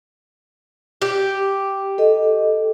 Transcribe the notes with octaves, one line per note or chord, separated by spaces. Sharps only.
G4
A4 D#5